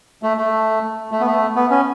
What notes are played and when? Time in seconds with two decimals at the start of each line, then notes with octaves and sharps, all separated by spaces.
0.23 A3
0.38 A3
1.12 A3
1.20 B3
1.26 A3
1.56 B3
1.71 C#4